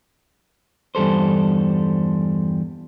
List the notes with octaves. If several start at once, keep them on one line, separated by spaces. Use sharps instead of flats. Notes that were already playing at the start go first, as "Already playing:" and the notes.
E2 G2 G3 A4 C5